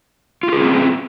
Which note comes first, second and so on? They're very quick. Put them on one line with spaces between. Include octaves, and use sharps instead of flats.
F4 G4 G#4 C#4 C4